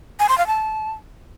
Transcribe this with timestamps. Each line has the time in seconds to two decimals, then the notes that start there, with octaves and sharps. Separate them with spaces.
0.19 G#5
0.29 C6
0.38 F5
0.47 A5